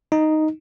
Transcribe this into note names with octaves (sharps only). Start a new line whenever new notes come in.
D#4